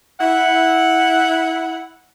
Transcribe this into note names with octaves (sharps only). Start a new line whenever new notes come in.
E4 F#5